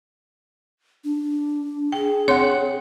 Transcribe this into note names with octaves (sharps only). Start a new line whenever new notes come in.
D4
G#4 G5
C4 C#5 F#5 C6